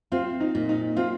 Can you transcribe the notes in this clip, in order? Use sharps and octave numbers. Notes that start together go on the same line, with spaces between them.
C4 F4
D#4
A#2
D#4
C4 F4